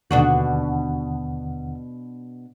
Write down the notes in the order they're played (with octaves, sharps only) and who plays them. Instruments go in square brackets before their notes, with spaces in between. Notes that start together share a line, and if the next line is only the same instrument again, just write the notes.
[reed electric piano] D#2 D3 F#5 [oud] B2 D4 F#4